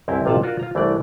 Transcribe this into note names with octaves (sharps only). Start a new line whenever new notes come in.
C2 F#2 C4 E4 G4
A1 C3 F4 F5 F#5 A5
D4 F4 F#4 A#4
F4 A#5
C2 E3 A3 D4 D5